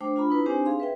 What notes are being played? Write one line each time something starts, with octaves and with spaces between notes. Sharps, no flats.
A3 D4 C5 G5 D6
D4 F4 A#5 B5
D#4 E4 B4
C4 D4 D#4 G4 C5 G#5
G#4 F5 C6
B4 E5 G5